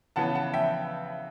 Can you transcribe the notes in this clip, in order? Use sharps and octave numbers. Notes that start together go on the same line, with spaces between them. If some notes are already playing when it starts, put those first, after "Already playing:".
C#3 E3 B3 F#5 A5
F#5 A5
E5 G5